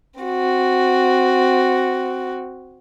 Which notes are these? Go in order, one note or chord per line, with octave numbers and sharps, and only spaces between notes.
C4 F#4